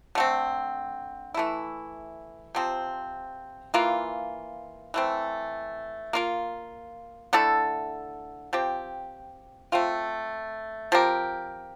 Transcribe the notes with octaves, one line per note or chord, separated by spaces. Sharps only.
D3 A3 C4
E3 A3 E4
C3 F3 C4
E3 A#3 F4
E3 A3 C4
A#3 F4 A#4
D3 A3 E4 A4
F3 C4 G4
A3 C4 F4
F3 C4 G4 A#4